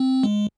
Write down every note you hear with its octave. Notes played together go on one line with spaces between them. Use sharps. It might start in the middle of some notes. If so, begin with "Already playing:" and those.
Already playing: C4
G#3